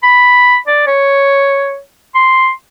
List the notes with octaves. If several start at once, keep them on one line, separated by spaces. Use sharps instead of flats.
B5
D5
C#5
C6